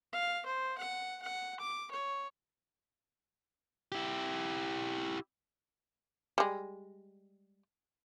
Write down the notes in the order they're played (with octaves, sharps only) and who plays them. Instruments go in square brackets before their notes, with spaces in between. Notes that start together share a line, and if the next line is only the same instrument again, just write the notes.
[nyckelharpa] F5
C5
F#5
F#5
D6
C#5
[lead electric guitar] E4 G4
[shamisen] G3 G#3